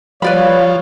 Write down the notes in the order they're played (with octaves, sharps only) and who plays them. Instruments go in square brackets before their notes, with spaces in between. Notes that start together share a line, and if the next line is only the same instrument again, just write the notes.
[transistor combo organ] F3 [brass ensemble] G3 C#5 [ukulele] B4 D5 B5 [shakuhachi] F5